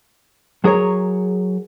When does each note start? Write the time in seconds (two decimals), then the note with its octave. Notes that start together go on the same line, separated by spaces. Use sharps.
0.64 F#3 G#4 A#4 C#5